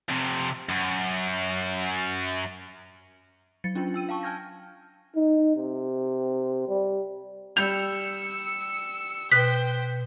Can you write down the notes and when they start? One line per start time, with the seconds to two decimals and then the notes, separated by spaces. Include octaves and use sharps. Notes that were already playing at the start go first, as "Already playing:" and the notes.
0.09 F2 C3
0.69 F#2
3.64 F#3 A6 C#7
3.75 C#4 D4 F4 G5
3.94 G5 E6 D#7
4.09 F5 G5 A5 C#6
4.23 G#5 A5 F6 G6 G#6 A#6
5.15 D#4
5.57 C3
6.68 G3
7.57 G3 E6 G6 C#7 F7
9.32 B2 B4 C5 G5 F#6 B6